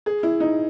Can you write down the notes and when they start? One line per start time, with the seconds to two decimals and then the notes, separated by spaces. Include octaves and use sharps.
0.06 G#4
0.23 E4
0.40 D#4